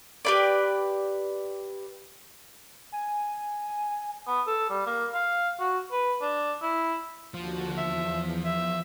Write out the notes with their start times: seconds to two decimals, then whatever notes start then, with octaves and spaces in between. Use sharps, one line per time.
0.25 G4 B4 D5
2.92 G#5
4.27 B3
4.47 A4
4.70 G3
4.86 A#3
5.14 F5
5.60 F#4
5.92 B4
6.21 D4
6.62 E4
7.34 D#2 D3 F3 F#4
7.77 E2 E5
8.45 E5